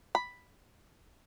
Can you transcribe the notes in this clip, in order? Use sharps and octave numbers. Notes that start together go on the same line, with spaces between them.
B5